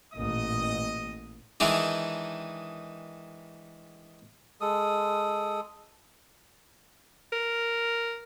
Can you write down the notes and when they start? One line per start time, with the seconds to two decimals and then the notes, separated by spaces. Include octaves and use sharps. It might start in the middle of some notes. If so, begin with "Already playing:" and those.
0.13 A1 A#2 D#5 D#6
1.60 D#3 E3 G#3 D4 D#4
4.61 G#3 A4 D#6
7.33 A#4